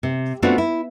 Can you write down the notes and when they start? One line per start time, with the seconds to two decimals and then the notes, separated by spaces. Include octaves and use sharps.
0.03 C3
0.42 A3 B3 C4 D4 F4 F#4
0.58 E4